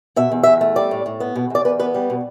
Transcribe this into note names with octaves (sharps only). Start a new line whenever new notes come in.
B2 E5
E2
E2 E5
A3
G3 D5
A2
A2
B3
B2
E2 D5
E2 B4
B3 B4
G3
B2